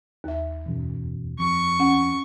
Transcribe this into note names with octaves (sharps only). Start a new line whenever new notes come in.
D#2 E5
E1 F#2
F2 C#6
C#4 F#5